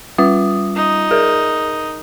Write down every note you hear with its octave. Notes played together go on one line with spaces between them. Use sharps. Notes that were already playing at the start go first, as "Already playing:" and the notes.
G3 F4 D#6
D#4
G#4 A#4